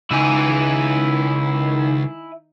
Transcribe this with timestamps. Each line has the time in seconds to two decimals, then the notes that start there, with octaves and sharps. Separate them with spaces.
0.11 C#2 D#3 D#4 E4 G#5